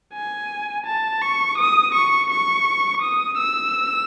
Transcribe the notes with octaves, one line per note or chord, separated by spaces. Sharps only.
G#5
A5
C#6
D#6
C#6
C#6
D#6
E6